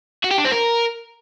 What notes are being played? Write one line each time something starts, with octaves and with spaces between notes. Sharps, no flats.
F#4
G4
D4
C4
A#4